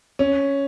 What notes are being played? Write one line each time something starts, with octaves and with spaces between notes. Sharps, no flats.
C#4